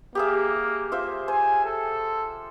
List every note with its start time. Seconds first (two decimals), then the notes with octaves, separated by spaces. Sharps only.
0.15 A#3 G4 G#4 E5
0.92 F4 C5 E5
1.28 C5 G#5
1.65 A4